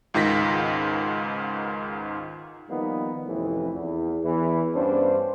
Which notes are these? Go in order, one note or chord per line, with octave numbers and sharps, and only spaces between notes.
C#2 G#2 D#3 F4 A#6 B6
D#3 F3 G3 A#3 B3 D#4
A1 F2 A2 C3 E3 F3
E2
E2 E3
G2 B3 C#4 D4 C5